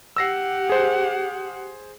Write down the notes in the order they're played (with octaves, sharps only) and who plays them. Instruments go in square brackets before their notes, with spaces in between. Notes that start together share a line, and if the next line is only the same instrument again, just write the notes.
[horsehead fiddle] G4 F#5 [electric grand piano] E6 A#6 C7
[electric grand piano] G#4 C5